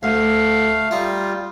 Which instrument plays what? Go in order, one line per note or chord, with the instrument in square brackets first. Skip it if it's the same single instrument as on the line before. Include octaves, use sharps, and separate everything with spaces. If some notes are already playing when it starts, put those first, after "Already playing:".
[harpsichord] D2 [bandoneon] A3 F5
[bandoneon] G3 F4 [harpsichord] D#4